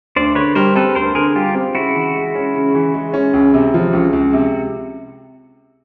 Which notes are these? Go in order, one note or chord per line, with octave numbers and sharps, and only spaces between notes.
D2 C5 D5
D3 B4 C#5
G3 A#4 C5
C4 A4 B4
D2 A#4 C5
D3 G#4 A#4
G3 F4 G4
C4
C#3 E4 F#4
E3
G#3
C#4
C#3
E3
G#3
C#4
C#2
C3
F3
C#2
C#2
C3